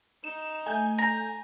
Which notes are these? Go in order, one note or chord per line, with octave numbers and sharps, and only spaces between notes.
D#4 E7
A3 G#5 G6
A#5